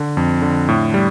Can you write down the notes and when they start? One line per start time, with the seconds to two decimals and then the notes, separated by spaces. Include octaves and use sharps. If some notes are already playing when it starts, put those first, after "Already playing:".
Already playing: D3
0.17 F2
0.42 D3
0.68 A2
0.94 G3